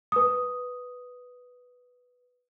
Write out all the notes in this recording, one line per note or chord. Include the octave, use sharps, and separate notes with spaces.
B4 D#6